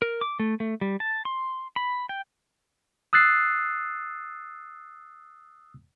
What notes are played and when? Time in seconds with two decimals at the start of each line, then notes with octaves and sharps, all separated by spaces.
0.02 A#4
0.21 D6
0.40 A3
0.60 A3
0.81 G3
1.00 A5
1.25 C6
1.76 B5
2.09 G5
3.13 D#6 E6 F#6 A6 C7